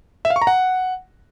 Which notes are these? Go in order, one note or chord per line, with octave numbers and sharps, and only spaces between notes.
E5
F5
C#6
A#5
F#5